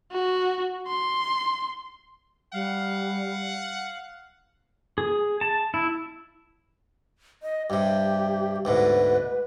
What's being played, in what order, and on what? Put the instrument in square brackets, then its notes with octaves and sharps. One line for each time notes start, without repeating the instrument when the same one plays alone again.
[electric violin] F#4
C6
[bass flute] G3 [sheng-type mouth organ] F5 [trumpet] F#5
[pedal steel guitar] G#4
A5
E4
[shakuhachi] D#5
[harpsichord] G2 C3 [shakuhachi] G4
[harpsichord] D2 G#2 B2 [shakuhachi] B4